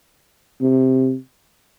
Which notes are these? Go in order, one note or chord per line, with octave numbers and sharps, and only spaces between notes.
C3